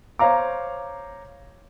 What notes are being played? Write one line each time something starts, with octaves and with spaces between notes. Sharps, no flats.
C5 C#5 F5 A#5 D6